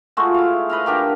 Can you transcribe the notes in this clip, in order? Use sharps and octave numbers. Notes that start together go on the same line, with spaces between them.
G#3 A3 F4 F#4
E4 F5
B4 D#5 F5
D3 D4 G4 A#4